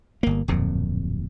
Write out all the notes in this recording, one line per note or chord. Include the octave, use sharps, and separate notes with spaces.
G1 A#3
D1 F2 A#2